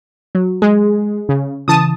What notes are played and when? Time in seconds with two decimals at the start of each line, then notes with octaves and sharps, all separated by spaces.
0.35 F#3
0.62 G#3 G#4
1.29 C#3
1.68 C#3 E3 A5 D#6